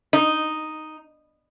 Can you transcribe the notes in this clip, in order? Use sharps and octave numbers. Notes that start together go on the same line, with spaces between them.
D#4